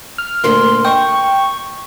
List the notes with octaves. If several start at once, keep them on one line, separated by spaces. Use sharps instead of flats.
F6
D2 A#2 C6
D#5 G5 C#6